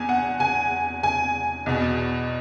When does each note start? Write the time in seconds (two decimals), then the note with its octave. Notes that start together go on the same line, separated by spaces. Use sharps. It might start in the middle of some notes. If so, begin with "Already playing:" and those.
Already playing: E2 G#5
0.09 F#5
0.40 G#5
1.03 G#5
1.66 E2 B2